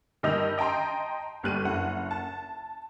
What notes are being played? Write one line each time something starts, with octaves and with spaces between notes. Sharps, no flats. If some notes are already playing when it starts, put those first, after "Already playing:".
G2 D#3 D#5 E6 G6 F7
D#5 G5 A5 A#5 C6
G1 G3 F#6 D#7
F#1 F#5
A5